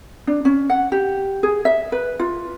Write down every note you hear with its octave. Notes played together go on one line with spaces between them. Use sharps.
D4
C#4
F#5
G4
G#4
E5
B4
F4